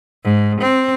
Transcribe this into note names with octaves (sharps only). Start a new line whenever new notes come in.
G#2
C4